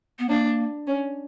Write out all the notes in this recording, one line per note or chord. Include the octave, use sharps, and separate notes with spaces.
B3
A#3 D4
C#4